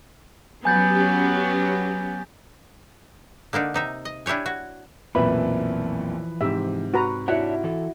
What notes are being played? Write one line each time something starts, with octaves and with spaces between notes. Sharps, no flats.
F#3 B3 C#4 G4 G#5 G6 A6
D3 A#3 D4 D#4
C3 D#4 E5
D#5
D4 E4 G4 C#5 G#5
F#4
B1 F2 A#2 E3 F3 B4 E5 B5
G#2 C3 G4 E5
F#4 B4 A#5
D4 E4 F#4 C#5 E5 F#5
E3 A4